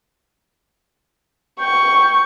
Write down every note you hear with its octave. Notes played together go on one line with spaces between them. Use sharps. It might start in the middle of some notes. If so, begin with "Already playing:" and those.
G5 C#6